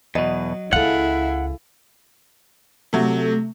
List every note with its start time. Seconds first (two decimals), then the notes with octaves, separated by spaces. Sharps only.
0.15 E2 B2 F#3 D#5
0.73 C#2 E4 G#4 A4 F5 F#5
2.93 C3 F#3 A3